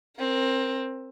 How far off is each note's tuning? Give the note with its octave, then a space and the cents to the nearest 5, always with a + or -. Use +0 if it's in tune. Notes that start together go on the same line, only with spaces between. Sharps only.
C4 +15 A#4 +0